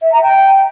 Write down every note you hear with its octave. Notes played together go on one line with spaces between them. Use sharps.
E5
A#5
G5